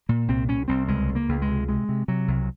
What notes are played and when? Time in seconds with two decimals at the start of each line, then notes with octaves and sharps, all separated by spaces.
0.09 A#2 A#3
0.28 C2 C4
0.48 C2 C#4
0.68 C2 C4
0.88 C#2 G#3
1.09 C#2
1.15 A#3
1.29 C#2
1.42 G#3
1.48 C3
1.68 C3 G#3
1.89 C3
2.08 C3 F#3
2.28 C2